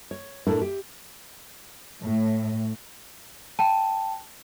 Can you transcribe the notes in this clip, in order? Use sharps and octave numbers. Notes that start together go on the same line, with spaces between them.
C#5
A2 D4 E4 A4 A#4
G4
A2
G5 A5